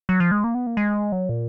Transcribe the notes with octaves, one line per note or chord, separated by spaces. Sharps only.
F#3
F3
G#3
A#3
B3
A#3
G#3
F#3
A#2